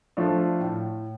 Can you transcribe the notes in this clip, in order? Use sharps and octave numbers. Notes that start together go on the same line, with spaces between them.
F3 A3 D4 F4
A2